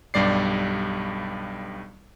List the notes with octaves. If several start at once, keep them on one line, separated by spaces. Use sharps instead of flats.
B1 G2 G3 D5 C7